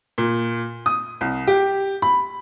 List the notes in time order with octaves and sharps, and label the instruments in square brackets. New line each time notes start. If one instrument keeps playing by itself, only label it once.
[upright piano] A#2
D#6
C2
G4
B5